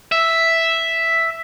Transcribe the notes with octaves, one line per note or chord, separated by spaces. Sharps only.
E5